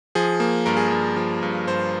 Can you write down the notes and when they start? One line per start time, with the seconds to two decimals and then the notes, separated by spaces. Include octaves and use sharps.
0.15 F3 G#4
0.40 A#3
0.66 G2 A#4
0.77 G#4
0.88 G2 A#4
1.17 F3
1.43 G2
1.67 G2 C5